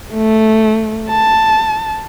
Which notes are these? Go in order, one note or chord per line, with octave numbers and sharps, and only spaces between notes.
A3
A5